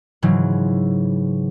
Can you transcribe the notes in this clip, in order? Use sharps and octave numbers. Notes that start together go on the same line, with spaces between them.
G#2 C#3 E3 F#3